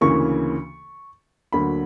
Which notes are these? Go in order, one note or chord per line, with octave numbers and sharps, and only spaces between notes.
D2 C#3 E3 A#3 C#6
D2 D3 F#3 A#3 B5